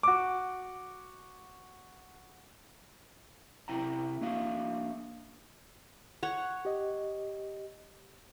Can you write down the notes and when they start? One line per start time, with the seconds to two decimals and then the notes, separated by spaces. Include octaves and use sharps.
0.03 F#4 D6
3.68 C3 E4 G5 A#5
4.21 A#3 D4 F#4 E5 F5
6.23 C#5 F#5
6.65 G4 D#5